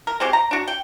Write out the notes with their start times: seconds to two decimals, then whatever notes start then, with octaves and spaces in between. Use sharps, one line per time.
0.07 A#4
0.20 G#3 C4 F#4 G4
0.33 A#5
0.51 D4 F#4
0.68 G5